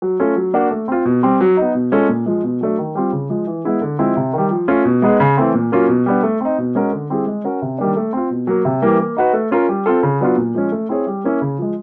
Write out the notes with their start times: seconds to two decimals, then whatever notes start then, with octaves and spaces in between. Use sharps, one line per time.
0.02 F#3
0.20 A3 C#4 F4 A4
0.36 F#3
0.53 A#3 D4 F#4
0.71 A3
0.88 C4 F4
1.05 B2
1.23 G3 C4
1.41 F#3
1.57 B3 D#4
1.75 B2
1.92 G#3 C#4 F4 A4
2.09 A#2
2.26 F3 G#3
2.44 B2
2.61 F#3 A3 D4
2.78 D#3
2.95 G3 C4 F4
3.13 C#3
3.30 F3 G#3
3.47 E3
3.65 G#3 B3 E4 G#4
3.82 D3
3.99 F3 G#3 C4 E4
4.17 C3
4.33 D#3 G3
4.51 F3
4.68 A3 C#4 F4
4.85 B2
5.02 G#3 B3 D#4 G#4
5.20 C#3
5.37 E3 A3 C4
5.54 A#2
5.72 F#3 A#3 C#4 F4
5.89 B2
6.06 G3 B3 D4
6.23 A3
6.41 C4 D#4
6.58 B2
6.75 G#3 C#4 F#4 A#4
6.92 D3
7.10 G3 C4 E4 G#4
7.27 G#3
7.44 C#4 F#4 A#4
7.62 C3
7.78 D#3 G3 A#3 D4
7.97 A3
8.13 C4 F4
8.30 B2
8.47 F#3 A#3
8.65 C3
8.82 E3 G3 A#3
9.00 A#3
9.17 D#4 F#4 B4
9.33 A3
9.51 C#4 F4 A#4
9.69 G3
9.86 C4 F4 A4
10.03 C#3
10.21 F#3 B3 D4 F4
10.38 A#2
10.55 F3 G#3 C#4
10.72 A3
10.89 C4 E4 G#4 C#5
11.07 G3
11.24 A#3 C#4 E4
11.41 C#3
11.58 F3 G#3